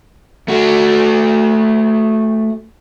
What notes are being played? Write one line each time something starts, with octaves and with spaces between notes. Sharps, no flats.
A3 F#4